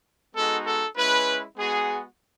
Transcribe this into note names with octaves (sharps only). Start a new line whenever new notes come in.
G#3 B3 D#4 F#4 A4
A4
G#3 C#4 E4 B4
G#3 B3 F#4 G#4